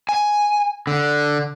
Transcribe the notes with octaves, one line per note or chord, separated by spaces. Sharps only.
G#5
D3